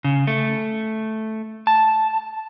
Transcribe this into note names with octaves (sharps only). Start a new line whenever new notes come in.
C#3
A3
A5